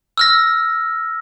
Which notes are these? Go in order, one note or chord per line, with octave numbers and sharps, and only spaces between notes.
E6 F6 A#6